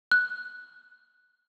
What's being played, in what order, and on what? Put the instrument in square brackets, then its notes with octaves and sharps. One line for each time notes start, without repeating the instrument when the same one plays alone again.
[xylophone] F#6